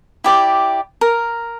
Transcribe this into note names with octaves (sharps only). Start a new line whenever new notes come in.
E4 G4 D5
A#4